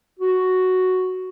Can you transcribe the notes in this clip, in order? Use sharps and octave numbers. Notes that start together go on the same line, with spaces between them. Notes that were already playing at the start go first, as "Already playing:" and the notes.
F#4